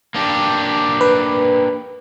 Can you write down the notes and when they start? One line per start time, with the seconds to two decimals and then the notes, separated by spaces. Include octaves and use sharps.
0.15 A#3 D4 G4
1.01 B4